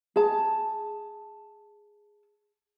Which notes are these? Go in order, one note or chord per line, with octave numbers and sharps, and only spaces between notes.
G#4 A5